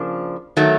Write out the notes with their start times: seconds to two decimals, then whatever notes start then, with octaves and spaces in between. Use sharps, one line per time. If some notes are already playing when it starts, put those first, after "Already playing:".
Already playing: C#3 F3 A#3 D4
0.57 D#3 F#3 A3